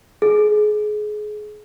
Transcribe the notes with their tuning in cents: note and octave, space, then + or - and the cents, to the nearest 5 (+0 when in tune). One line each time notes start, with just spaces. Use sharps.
G#4 +25